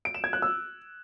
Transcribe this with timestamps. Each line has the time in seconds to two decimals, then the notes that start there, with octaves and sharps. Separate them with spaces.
0.05 D7
0.14 E7
0.24 G#6
0.33 F#6
0.42 E6